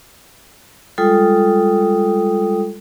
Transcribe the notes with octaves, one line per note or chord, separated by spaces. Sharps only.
G3 G#3 F4 A4 G5 D#6